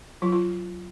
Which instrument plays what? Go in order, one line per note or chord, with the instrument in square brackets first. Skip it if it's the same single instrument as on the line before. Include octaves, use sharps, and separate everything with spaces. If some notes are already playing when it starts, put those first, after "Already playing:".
[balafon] F#3 F4
F4